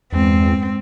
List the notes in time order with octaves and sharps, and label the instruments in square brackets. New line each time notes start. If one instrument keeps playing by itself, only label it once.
[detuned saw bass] E2 [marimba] G2 G#3 [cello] C4